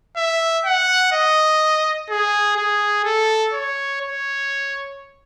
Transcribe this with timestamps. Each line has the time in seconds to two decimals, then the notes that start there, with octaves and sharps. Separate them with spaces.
0.16 E5
0.65 F#5
1.13 D#5
2.10 G#4
2.57 G#4
3.05 A4
3.54 C#5
4.02 C#5